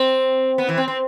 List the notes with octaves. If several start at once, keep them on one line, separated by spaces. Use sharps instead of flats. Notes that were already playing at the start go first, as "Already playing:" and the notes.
Already playing: C4
B3
E3
C4
C4